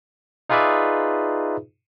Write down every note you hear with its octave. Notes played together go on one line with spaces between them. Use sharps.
D#4 F4 G#4 B4 D5 E5